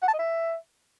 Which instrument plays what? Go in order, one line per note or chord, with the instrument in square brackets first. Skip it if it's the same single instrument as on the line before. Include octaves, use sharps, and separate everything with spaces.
[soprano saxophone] F#5
A5
D#5
E5